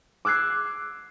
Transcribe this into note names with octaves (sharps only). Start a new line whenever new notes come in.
D6 E6 F#6 G#6 C7